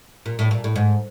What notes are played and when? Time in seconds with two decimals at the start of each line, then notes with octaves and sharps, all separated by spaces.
0.26 A#2
0.39 A2
0.51 A#2
0.64 A2
0.76 G#2